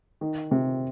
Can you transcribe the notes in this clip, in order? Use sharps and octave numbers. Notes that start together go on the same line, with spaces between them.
D#3
C3